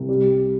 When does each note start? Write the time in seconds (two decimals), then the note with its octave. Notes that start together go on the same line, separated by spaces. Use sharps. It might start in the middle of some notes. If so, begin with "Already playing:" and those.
Already playing: C2
0.09 G3